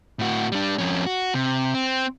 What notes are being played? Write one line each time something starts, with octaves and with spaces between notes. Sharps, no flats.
A2 F#4
G3 D4
F2 C#4
F#4
C3
C4